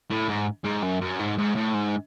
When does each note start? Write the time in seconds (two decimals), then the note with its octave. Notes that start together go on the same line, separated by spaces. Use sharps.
0.10 A2
0.28 G#2
0.64 G#2
0.83 F#2
1.01 F#2
1.19 G#2
1.38 G#2
1.55 A2
1.74 G#2